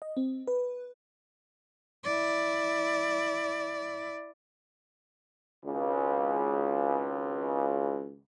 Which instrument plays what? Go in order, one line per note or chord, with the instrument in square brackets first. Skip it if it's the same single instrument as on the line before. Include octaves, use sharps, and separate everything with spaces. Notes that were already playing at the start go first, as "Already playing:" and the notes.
[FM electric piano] D#5
C4
B4
[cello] E4 D5
[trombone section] G#1 C#2